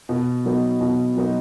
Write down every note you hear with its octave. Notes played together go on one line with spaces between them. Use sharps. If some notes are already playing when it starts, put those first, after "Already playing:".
B2
F#3 B3 D#4
B2
F#3 B3 D#4